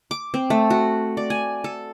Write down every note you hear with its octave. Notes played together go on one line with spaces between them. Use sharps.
D6
C4
A3
F#4
D5
G#5
A4